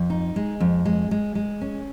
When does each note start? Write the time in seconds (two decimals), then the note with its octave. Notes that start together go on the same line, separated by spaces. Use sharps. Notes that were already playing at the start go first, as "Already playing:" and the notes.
Already playing: F2
0.10 D#4
0.36 G#3
0.60 F2
0.85 G#3
1.11 G#3
1.35 G#3
1.61 C#4